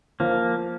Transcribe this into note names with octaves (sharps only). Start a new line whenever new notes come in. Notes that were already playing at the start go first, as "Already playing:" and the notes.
F3 A#3